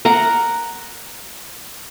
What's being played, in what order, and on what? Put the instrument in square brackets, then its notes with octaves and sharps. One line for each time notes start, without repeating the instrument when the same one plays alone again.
[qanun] A#4 F#5 A#5